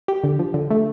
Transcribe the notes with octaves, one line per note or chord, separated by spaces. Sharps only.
G4
D3
F3
D3
A3